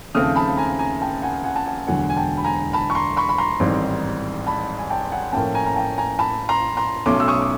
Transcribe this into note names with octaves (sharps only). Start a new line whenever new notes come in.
D#2 C#3 F3 A3 C4 D#6 F6
A5 B5
G#5 A#5
G#5 A#5
G5 A5
F#5 G#5
F#5 G#5
A5
F#5 G#5
E1 D2 D3 F#3 F#5 G#5
G#5
G5 A5
B5
G#5 A#5
A5 B5
C#6
A#5 C6
B5 C#6
B5
A#5 C6
A1 G#2 D#3 G3 C4
A5 B5
G#5
G5 A5
F#5 G#5
A2 F3 A#3 C#4 G5 A5
G#5 A#5
A#5
G5 A5
G#5 A#5
A5 B5
A#5 C6
A#5 C6
B1 B2 F#3 A3 C#4 C6 D6
E6
C#6 D#6
D6